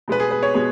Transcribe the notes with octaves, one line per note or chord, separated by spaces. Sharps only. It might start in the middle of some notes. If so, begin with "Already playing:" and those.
B2 G#3 B3 B4
G#4
B4
C#5
B2 G#3